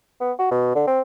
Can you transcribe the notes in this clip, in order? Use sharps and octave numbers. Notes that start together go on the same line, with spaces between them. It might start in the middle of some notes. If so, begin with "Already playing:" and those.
B3
F#4
B2
D3
C4